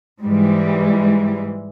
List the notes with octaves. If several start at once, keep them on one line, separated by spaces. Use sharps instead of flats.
G#2 E3 G3 G#3